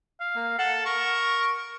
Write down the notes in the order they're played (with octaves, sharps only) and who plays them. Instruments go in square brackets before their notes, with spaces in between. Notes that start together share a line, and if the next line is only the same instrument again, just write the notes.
[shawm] F5
[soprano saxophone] A#3
[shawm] A4 [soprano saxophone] F#5
[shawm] A#4 [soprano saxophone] C#6